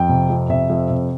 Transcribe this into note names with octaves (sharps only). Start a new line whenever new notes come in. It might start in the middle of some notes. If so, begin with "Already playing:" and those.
Already playing: F2 G5
C3
F2
C3 E5
F2
C3